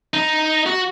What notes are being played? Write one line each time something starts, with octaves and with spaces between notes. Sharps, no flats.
D#4
F#4